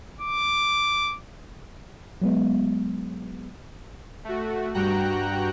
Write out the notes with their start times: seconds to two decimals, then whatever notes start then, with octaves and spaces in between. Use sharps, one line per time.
0.21 D6
2.22 F#3 G#3 B3
4.25 A3 F#4
4.74 G2 F#4 G5 A#5 F#6